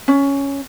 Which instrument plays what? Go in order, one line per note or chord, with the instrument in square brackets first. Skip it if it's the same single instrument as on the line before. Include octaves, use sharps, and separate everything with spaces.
[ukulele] C#4